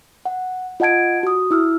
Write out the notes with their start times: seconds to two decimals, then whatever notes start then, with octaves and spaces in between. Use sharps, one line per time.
0.25 F#5
0.80 F4 D#5 F#5 A5 G#6 D7
1.23 F#4 D#6
1.51 E4 E6 F6